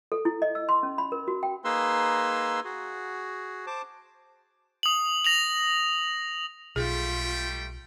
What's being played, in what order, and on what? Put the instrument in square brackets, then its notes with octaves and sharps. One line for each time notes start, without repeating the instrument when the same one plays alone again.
[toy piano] A4
E4
D#5
E6
C6
C#4
B5
A#4
F#4
G5
[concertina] A#3 D#4 G#4 B4 C6 E6
F#4 G#4
C5 A5 D6
[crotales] D#6 F#7
A#6 F7 F#7
[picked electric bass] B1 [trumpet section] G3 A3 G5 [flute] F4 [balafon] G#4